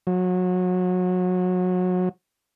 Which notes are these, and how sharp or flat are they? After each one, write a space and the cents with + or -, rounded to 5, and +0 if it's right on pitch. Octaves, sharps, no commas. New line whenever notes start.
F#3 -25